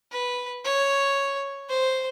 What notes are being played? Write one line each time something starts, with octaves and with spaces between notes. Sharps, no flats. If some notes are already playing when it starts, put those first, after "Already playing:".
B4
C#5
C5